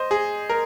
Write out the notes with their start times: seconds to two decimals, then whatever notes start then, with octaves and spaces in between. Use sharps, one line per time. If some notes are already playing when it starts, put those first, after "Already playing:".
Already playing: C5 D#5
0.11 G#4
0.49 A#4